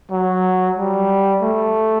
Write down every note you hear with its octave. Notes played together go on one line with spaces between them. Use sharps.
F#3
G3
A3